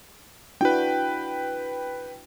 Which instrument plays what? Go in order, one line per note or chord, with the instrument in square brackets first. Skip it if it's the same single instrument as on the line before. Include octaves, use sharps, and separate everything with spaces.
[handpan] D4 E4 F#4 [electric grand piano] B4 G5